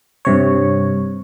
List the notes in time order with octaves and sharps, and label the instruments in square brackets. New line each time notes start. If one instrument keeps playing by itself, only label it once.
[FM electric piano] G2 C3 C#5